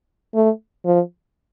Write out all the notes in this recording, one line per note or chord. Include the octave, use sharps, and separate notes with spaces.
A3
F3